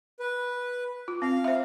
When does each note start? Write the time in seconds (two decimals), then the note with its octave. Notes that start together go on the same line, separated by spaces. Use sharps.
0.20 B4
1.08 F4
1.22 C4 F5
1.44 C5 E5